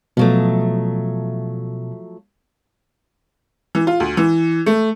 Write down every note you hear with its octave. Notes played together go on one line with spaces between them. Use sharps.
B2 F3 F#3 A3
E3
F4
D2
E3
A3